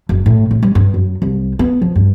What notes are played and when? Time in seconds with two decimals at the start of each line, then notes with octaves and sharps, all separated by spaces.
0.09 F#1
0.26 A2
0.51 A2
0.63 G3
0.75 G2
0.94 F#2
1.22 C2
1.59 B3
1.82 F3
1.96 G2